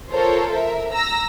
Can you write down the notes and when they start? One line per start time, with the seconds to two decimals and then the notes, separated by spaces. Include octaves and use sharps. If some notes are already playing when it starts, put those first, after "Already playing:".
0.12 F4 A4 A#4 C5 C#5
0.52 A#4 E5
0.92 A#5 E6 A#6